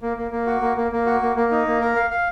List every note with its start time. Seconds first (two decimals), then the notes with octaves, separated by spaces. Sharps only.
0.02 A#3
0.17 A#3
0.31 A#3
0.47 F#4
0.61 A#3
0.77 A#3
0.92 A#3
1.06 F#4
1.21 A#3
1.36 A#3
1.51 D#4
1.67 A#3
1.81 A#4
1.96 F5
2.10 F5